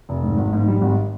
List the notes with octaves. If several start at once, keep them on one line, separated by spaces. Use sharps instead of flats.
F1
G#2
G#1
G#2
G3
G#1